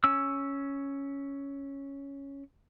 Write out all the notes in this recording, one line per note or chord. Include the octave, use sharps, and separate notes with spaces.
C#4 E6